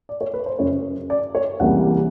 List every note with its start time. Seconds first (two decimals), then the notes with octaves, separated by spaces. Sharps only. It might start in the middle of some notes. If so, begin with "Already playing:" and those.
0.09 D5
0.21 C#5
0.34 B4
0.46 C5
0.59 F#2 C#3 F#3 C#5
1.10 D5
1.35 C#5
1.60 C#2 C3 E3 G3 A#3 F#5